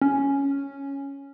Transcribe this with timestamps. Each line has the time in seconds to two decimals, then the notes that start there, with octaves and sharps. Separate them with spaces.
0.02 C#4